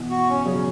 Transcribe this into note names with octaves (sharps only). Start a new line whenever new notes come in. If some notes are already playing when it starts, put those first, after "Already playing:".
Already playing: B2 E3
F#4
C#4
C#3 F#3 C#4